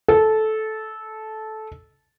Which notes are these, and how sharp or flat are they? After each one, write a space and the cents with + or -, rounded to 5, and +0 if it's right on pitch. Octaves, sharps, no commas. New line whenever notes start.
A4 -15